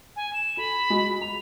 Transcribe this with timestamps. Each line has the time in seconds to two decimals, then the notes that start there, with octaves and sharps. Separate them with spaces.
0.16 G#5
0.33 E7
0.57 A4 B5
0.90 G#3 F#4
1.21 B5 F7